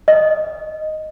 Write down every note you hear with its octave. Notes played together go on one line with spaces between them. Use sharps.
D#5